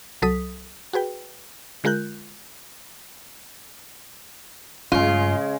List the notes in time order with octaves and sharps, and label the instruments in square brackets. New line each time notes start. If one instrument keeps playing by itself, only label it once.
[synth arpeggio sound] C2 F#3 A4 D#6 B6
F#4 G#4 B4 G5
D3 G#3 F4 A#4 F#6 G6
[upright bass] G2 [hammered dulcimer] C#3 G#3 [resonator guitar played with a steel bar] F4